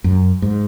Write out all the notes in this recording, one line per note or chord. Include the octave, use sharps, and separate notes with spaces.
F#2
G#2